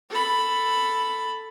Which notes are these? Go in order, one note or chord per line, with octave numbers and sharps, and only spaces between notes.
A4 B5